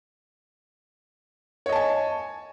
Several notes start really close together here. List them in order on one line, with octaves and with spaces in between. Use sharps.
C#5 D#5 A5 G#5